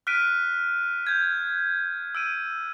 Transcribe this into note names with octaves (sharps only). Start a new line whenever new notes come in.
F6 F#6 B6 D7 D#7
G6 G#6
E6 D7 D#7